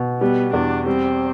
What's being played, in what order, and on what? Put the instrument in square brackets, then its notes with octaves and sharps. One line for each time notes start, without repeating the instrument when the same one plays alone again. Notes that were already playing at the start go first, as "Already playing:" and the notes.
Already playing: [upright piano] B2
[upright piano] G3 [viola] B3
[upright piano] E2 [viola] D4
[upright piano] G3 [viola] C4